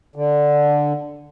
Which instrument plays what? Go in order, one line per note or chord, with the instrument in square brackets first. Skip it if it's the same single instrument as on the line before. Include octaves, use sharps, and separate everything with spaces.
[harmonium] D3